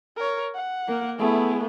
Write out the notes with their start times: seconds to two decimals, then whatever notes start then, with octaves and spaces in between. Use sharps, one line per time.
0.17 A#4 C#5
0.55 F#5
0.88 A#3 A#4
1.19 A3 B3 E4 G#4